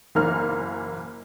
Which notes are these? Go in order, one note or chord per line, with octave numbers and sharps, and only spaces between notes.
F#1 E3 A#3 A#5 F6